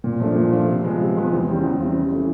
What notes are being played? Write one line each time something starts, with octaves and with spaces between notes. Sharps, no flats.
A#2
F3 A3 D4
A#2
F3 A3 D4
C3
F3 G#3 B3
C3
F3 G#3 B3
E2
C#3 E3 G3 C4
E2
C#3 E3 G3 C4
C#3
E3 A3